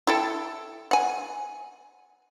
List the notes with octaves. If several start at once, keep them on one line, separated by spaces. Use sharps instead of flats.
E4 A4 G5
F#5 G#5